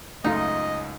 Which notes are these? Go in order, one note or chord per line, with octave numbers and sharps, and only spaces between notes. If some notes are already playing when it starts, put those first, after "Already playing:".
C#2 F#2 A3 D#4 F4 D#5